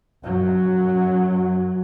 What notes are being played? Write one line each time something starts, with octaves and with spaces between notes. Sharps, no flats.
F#2 F#3